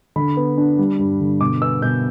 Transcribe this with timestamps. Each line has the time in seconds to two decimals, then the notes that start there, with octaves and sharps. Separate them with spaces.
0.16 D3 B5
0.37 B3
0.58 D4
0.78 G3
0.99 G2
1.20 D3
1.41 B2 D6
1.62 B3 E6
1.82 B2 G6